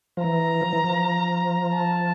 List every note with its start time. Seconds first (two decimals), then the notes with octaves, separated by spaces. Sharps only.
0.17 F3
0.24 E3 A#5
0.61 F3
0.73 E3
0.84 F3
1.74 A5